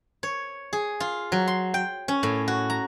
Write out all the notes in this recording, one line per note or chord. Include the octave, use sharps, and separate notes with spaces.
C#5
G#4
F4
F#3
C6
G5
C#4
A2
F#4
A#5